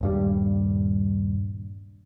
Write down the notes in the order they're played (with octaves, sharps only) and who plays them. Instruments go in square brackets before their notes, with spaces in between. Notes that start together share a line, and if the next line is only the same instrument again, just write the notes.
[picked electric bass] D#1 G2 G3